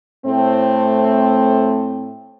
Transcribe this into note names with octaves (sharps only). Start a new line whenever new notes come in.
A2 A3 C4